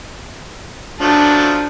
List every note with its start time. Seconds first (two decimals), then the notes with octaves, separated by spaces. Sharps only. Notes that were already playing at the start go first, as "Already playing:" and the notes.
1.00 F3 F#3 A3 D4